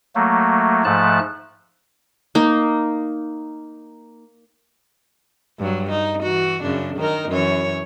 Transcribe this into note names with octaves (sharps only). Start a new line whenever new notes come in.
F#3 A3 A#3
G#2 F3 A3 A5 F#6
A#3 D#4
G2 F#3
D#4
E3 F#4
F#2 C#3 D4
D#3 D#4 A#4
F#2 E3 C#5